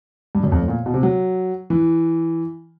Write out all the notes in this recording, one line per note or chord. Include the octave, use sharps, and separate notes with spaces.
G2
F#2
F2
A2
A#2
B2
C3
F#3
E3